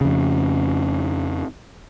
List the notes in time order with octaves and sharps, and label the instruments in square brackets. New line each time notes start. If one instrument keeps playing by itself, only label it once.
[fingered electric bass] F2 C#3